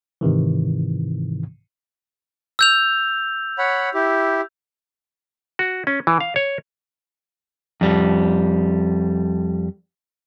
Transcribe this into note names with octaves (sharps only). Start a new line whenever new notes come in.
G#2 C3 D#3 E3
E6 G6 F7
C#5 F#5 B5
E4 G4
F#4
C#4
E3
F5
C#5
F2 G3